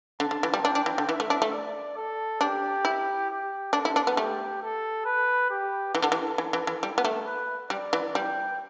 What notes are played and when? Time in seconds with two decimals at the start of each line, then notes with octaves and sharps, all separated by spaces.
0.20 D3 A5
0.31 D3
0.43 E3
0.54 G3
0.65 D4 G5
0.75 D4
0.86 E3
0.98 D3
1.09 E3 E5
1.20 A3
1.30 D4
1.42 A3
1.53 D5
1.97 A4
2.41 D4 G4
2.85 E4
3.30 G4
3.73 D4 A4
3.85 E4
3.96 D4
4.07 B3
4.17 A3 G4
4.62 A4
5.05 B4
5.50 G4
5.95 E3 A4
6.02 D3
6.12 E3
6.38 E3
6.53 E3
6.67 E3
6.83 G3
6.98 B3
7.04 A3
7.26 B4
7.70 G3 D5
7.93 E3
8.15 G3 G5